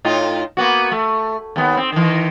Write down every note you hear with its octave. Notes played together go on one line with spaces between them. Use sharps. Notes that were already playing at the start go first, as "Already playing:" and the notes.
A2 D#4 F4
A#3 B3 F#4
A3
D#2 B3
C4
D#3 E3